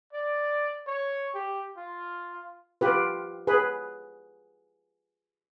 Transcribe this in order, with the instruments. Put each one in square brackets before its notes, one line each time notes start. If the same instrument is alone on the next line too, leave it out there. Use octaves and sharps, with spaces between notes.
[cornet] D5
C#5
G4
F4
[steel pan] F4 G4 B4
G#4 B4